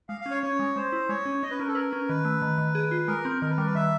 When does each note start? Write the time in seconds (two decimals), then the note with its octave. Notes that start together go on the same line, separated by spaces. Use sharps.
0.09 G#3 F5
0.21 C#4 F5
0.31 C#5
0.43 C#4 C#5
0.59 G#3
0.76 G#3 C5
0.92 E4
1.09 G#3 C#5
1.25 C#4
1.43 C#4 D#5
1.51 B4
1.59 C#4 A#4
1.68 A4
1.75 A#4 B4
1.93 C#4
2.09 D#3 B4
2.25 A3
2.42 D#3
2.58 D#3
2.75 G#4
2.91 F4
3.08 G#3 A#4
3.25 C4
3.42 D#3 A#4
3.50 B4
3.58 G3 A#4
3.66 B4
3.75 D#3 E5